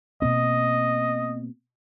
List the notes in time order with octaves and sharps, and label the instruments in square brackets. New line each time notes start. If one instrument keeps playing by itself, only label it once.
[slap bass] B2 A#3 C4 [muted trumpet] D#5